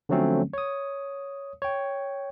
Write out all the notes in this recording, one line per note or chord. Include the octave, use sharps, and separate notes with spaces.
D3 F3 F#3 A3 C4 C#4
C#5 D#6
C#5 G5